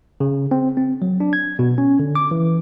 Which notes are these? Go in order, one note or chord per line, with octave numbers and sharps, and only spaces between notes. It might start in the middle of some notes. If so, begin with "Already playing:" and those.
C#3
C4
C4
F#3
D4
G#6
B2
C#4
D3
D6
E3